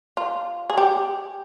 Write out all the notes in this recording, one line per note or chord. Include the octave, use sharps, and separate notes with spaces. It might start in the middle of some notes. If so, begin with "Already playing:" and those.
F4
G#4
G4